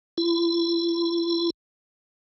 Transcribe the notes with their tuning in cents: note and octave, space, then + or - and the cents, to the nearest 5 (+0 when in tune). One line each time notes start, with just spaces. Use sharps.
E4 +45